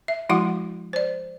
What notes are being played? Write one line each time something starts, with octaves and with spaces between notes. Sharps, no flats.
E5
F3 G#3 E4 F#4 F#5 C6
C5 D5